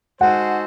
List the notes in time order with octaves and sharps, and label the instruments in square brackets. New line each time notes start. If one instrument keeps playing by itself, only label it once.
[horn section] G#3 D#4 F#4 A4 C5 [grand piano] F#5